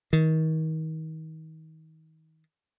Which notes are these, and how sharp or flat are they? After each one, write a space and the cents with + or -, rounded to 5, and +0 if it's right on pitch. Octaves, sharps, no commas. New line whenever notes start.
D#3 +30